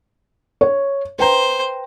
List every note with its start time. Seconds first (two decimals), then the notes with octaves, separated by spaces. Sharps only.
0.61 C#5
1.19 B4 C5 G5 A#5